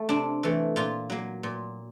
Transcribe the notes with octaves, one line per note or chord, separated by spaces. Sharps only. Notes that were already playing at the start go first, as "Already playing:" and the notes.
Already playing: A3
C3 D4
E3 A3
A#2 F4
F#3 A#3
A#2